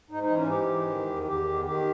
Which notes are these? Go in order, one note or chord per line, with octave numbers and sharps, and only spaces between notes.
G#2 D#4
D#4
E3
C#4
G#2 G4
E3
D#3
E2
E2 G4
D#3
D#3 G4